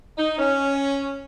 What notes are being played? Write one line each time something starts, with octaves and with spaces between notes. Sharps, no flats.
D#4
C#4